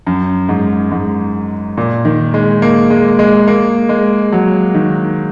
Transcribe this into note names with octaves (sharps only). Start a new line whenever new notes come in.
F#2
G#2
G#2
A#2
D#3
G#3
A#3
G#3
G#3
A#3
G#3
F#3
D#3